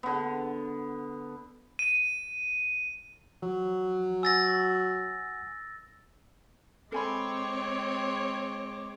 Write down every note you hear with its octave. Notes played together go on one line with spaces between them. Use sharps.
D3 B3
D#7
F3 F#3
F#5 G#5 E6 A6 A#6
G#3 C4 A4 C#5 G#5 B5 D6